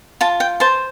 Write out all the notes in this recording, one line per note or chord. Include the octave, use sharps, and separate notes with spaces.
F4 A5
G5
C5 A5